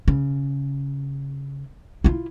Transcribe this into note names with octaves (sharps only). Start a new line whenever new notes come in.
C#3
E4 F4